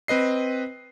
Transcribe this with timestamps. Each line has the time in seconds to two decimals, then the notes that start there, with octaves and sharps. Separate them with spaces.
0.08 C4 B4 D#5 C7